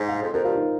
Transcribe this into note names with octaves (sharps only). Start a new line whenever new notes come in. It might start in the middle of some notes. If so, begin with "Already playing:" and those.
Already playing: G#2
F5
F2 C5
F2 A#4
G2 F4
D#4